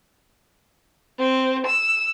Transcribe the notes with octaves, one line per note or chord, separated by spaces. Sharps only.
C4
E6